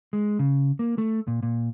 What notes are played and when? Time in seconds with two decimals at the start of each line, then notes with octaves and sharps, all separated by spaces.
0.13 G#3
0.39 C#3
0.79 A#3
0.98 A3
1.27 A#2
1.43 A#2